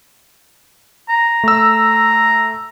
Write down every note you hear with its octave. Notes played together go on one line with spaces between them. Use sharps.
A#5
A3 E6